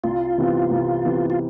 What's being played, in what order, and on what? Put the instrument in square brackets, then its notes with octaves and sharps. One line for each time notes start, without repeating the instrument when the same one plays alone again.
[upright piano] C2 [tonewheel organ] F4
[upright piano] C3 E3 B3
C2
C3 E3 B3
[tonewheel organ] F4